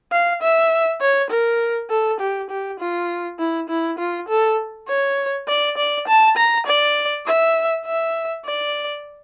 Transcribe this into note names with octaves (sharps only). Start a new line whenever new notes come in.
F5
E5
C#5
A#4
A4
G4
G4
F4
E4
E4
F4
A4
C#5
D5
D5
A5
A#5
D5
E5
E5
D5